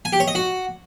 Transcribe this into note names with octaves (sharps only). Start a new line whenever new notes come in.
G#5
G4
C#5
D#5
F#4